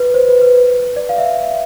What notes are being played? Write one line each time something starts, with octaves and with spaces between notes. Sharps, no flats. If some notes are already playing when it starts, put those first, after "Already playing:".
Already playing: B4
C5
B4
B4
D5
F5
E5